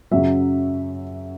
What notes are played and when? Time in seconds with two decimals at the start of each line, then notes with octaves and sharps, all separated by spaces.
0.11 F#2 C#3 F#3 E5